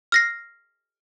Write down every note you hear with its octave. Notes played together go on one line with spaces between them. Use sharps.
F6 A#6 C7